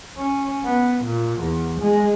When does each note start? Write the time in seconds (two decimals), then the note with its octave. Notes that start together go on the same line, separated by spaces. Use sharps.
0.18 C#4
0.65 B3
1.04 A#2
1.40 E2
1.81 G#3